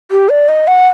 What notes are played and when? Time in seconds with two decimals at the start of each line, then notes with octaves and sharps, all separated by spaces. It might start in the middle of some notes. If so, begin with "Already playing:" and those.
0.11 G4
0.29 D5
0.48 D#5
0.67 F#5